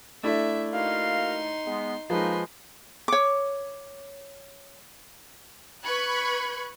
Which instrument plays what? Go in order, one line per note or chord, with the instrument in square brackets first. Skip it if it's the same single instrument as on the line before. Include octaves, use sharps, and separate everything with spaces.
[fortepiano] A3 D4 E4 [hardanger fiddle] E5
[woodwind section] A#3 F#4 F5 [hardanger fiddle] D#4 C6
[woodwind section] G#3 B3
[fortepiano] F3 G#3 [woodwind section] A#3 D#4 [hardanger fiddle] B4 C6
[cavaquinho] C#5 D6
[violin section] B4 B5 C#6 F#6 G#6